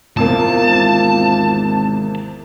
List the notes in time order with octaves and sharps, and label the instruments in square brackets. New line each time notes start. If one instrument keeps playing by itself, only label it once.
[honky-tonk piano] E2 C3 A#3 [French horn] F4 [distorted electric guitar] A5
[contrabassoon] G#1